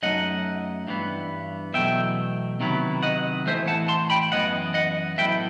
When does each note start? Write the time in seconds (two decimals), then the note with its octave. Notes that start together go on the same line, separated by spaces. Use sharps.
0.03 F#2 F#3 A3 D#4 D#5 F#5
0.88 G2 E3 B3
1.73 E2 B2 F#3 A3 E5 G5
2.60 C3 D#3 F#3 B3 E4
3.03 D#5 F#5
3.46 A2 E3 A3 E4 C5 E5
3.67 F#5 A5
3.88 A5 C6
4.10 G5 B5
4.32 F#2 E3 B3 D#5 F#5
4.74 D#5 F#5
5.18 A2 F#3 B3 E4 E5 G5